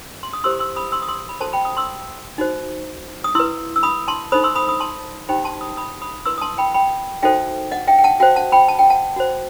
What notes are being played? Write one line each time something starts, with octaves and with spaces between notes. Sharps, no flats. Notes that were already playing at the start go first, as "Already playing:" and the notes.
C6
D#6
E4 G4 C5 C6 E6
C6 E6
B5 D#6
C6 E6
D#6
C6 E6
B5
F#4 A4 C5 A5 C6
G5 B5
B5 D#6
C6 E6
D#4 F#4 C5
D#6
E4 B4 C6 E6
E6
B5 D#6
A5 C6
D#4 A4 C5 B5 D#6
C6 E6
B5 D#6
B5 D#6
A5 C6
D#4 G4 C5 G5 B5
A5 C6
B5 D#6
B5 D#6
B5 D#6
E4 B4 C6 E6
D#6
A5 C6
G5 B5
G5 B5
D#4 F#4 A4 C5 E5 G5
D#5 F#5
E5 G5
G5
F#5 A5
F#4 C5 E5 G5
F#5 A5
G5 B5
A5
G5
F#5 A5
F#4 C5